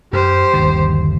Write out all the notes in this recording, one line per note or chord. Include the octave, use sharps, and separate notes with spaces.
F#2 G4 C5
G1 D#2 D3